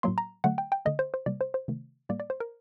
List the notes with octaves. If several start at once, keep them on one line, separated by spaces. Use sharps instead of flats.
A2 F#3 A#3 C6
A#5
D3 F#3 A3 F#5
G5
G5
D3 A3 D#5
C5
C5
C3 G3 A#3 D5
C5
C5
C3 D#3 A3
A2 G3 A#3 D5
D5
C5
A#4